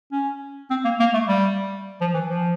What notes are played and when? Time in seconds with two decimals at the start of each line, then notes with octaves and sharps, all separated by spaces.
0.12 C#4
0.70 C4
0.85 A#3
1.00 A#3
1.14 A3
1.28 G3
2.01 F3
2.14 E3
2.29 F3